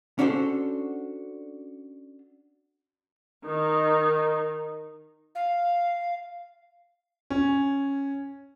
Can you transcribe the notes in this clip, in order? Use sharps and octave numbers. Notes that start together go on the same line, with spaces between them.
C#4 D4 F#4 A4 C5
D#3 D#4
F5
C#4